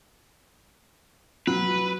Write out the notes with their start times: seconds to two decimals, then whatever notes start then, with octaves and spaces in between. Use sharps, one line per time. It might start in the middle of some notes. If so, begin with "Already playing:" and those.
1.47 F#3 B4